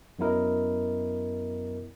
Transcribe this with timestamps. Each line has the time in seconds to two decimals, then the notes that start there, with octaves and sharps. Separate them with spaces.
0.19 F#2 F#3 B3 E4 A#4 D#5